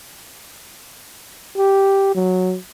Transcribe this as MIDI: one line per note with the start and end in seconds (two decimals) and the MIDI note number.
1.57 2.14 67
2.15 2.56 54